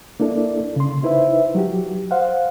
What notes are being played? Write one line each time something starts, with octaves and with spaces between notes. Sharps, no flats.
A#3 D4 E4 A4 D5
C#3 C6
D#4 E4 B4 C5 E5
F#3 F#4 G4
C5 F5 F#5